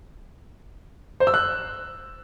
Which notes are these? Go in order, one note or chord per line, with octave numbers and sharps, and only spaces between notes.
C5
E6
F#6